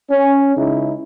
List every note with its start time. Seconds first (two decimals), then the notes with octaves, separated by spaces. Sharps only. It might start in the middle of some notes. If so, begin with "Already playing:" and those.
0.11 C#4
0.56 C#2 C#3 D#4 E4